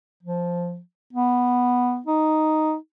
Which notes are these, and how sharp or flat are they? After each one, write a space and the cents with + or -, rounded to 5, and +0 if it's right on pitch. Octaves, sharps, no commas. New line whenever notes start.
F3 +0
B3 +0
D#4 +0